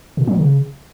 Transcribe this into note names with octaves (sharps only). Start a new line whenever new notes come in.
A#2
F#3
C#3